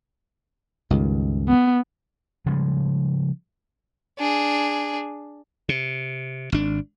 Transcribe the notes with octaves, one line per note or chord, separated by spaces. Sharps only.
C#2 G2 D#3
B3
C#3 F3 G3 G#3
D4 G#4
C3
G#1 D4